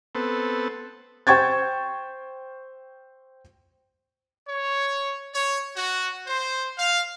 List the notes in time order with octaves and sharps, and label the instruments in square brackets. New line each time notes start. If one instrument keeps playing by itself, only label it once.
[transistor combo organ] B3 C4 A4
[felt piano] C5 G5 C#6 G#6 A6
[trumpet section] C#5
C#5
F#4
C5
F5